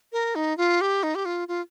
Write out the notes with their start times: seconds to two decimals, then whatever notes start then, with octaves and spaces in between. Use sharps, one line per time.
0.12 A#4
0.35 D#4
0.57 F4
0.81 G4
1.03 D#4
1.15 G4
1.25 F4
1.48 F4